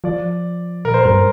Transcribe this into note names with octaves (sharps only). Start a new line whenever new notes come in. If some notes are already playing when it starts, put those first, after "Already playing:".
F3 D5
A#2 A#4
C5
G2 A#4